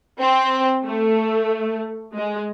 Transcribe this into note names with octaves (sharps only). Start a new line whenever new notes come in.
C4
A3
G#3